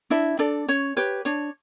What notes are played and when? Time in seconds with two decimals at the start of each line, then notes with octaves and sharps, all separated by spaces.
0.10 D4 E4 E5
0.39 D4 A4 D5
0.68 C#4 C#5
0.97 G4 B4 C#5
1.25 D4 C#5